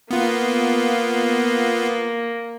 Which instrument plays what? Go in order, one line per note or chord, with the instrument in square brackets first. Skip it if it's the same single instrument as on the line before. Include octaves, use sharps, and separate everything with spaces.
[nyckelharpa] A#3 [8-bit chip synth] B3 F4